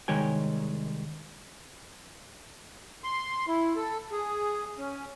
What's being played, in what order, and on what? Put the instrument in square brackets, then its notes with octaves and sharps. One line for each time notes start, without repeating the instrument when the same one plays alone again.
[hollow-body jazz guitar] C2 D#3 G#3 C#5 G5 G#5
[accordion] C6
E4
A4
G#4
C#4